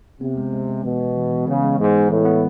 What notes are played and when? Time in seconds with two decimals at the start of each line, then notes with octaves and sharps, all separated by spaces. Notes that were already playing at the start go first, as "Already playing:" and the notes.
0.21 C3 B3
0.38 G#3
0.53 G#3
0.68 G#3
0.84 B2 E3
1.00 B3
1.16 E3
1.31 E3
1.47 C#3 B3
1.63 G#3
1.78 G#2 E3
1.94 G#3
2.10 A2 E3
2.25 B3